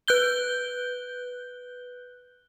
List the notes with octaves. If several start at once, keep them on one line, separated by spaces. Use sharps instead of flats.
B4 F#6 G6 G7